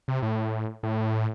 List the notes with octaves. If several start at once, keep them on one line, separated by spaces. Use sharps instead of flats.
C3
A2
A2